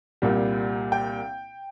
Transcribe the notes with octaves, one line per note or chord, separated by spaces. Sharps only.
C2 A#2 G3
G5